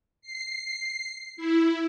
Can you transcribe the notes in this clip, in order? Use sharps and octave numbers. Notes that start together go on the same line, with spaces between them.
C7
E4